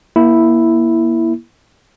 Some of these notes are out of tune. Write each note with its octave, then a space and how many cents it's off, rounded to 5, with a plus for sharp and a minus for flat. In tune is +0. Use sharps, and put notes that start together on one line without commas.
A#3 +30 E4 +0